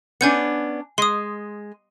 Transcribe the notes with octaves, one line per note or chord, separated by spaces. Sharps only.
B3 C#4 D4 G#5 G6 C#7
G#3 C6 D#6